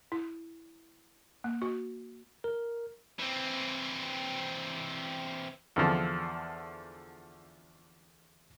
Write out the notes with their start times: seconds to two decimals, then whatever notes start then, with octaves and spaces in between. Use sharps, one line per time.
0.12 E4
1.44 A#3
1.62 F#4
2.44 A#4
3.19 E3 C4
5.76 E2 D3 F3